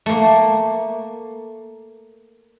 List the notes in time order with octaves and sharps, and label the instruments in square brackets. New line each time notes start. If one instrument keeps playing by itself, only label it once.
[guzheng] A3 A#3